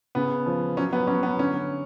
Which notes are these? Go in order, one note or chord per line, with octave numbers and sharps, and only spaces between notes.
C#3 B3
F3
F#3 C#4
B3
F#3 C#4
B3
D3 C#4